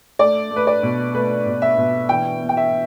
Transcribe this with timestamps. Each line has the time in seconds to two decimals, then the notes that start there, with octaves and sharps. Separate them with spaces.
0.19 A3 D5
0.51 A3
0.56 B4
0.67 D5
0.83 B2
1.14 A3 B4
1.46 B2
1.62 E5
1.77 B2
2.09 E3 G5
2.41 B3
2.49 G5
2.57 E5